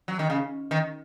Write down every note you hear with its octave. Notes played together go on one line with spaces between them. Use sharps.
F#3
D#3
C#3
D#3